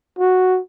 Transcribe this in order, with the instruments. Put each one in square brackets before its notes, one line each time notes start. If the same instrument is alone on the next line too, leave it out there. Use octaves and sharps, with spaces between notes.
[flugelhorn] F#4